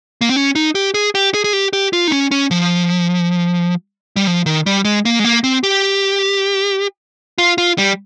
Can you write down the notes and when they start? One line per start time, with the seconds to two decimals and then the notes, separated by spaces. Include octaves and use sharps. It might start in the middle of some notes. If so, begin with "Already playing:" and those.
0.21 A#3
0.29 C4
0.36 C#4
0.55 D#4
0.75 G4
0.94 G#4
1.15 G4
1.34 G#4
1.44 G#4
1.53 G4
1.73 G4
1.93 F4
2.08 D#4
2.12 C#4
2.31 C#4
2.51 F3
4.16 G3
4.27 F3
4.46 D#3
4.66 G3
4.85 G#3
5.05 A#3
5.19 G#3
5.25 A#3
5.44 C4
5.63 G4
7.38 F4
7.58 F4
7.78 G3